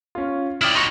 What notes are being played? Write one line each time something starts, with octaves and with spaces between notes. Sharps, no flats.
C#4 F4
E4 D5 G5 D#6 F6
D#4 F#4 C6 C#6